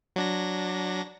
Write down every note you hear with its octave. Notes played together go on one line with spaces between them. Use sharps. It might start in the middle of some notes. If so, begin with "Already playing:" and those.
F#3 D4 A#6